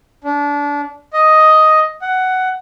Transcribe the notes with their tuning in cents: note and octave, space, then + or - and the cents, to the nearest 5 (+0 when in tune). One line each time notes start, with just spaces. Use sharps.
D4 -25
D#5 +5
F#5 +10